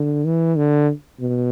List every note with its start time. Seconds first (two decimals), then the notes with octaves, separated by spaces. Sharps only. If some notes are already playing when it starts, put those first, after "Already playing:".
Already playing: D3
0.25 E3
0.57 D3
1.20 B2